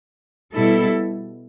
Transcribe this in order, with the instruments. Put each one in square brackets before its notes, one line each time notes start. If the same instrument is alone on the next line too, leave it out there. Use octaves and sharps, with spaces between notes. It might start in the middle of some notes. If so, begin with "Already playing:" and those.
[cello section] B2 G3 E4 A4